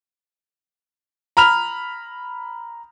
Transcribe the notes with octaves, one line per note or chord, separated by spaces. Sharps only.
A#5 B5 F6 F7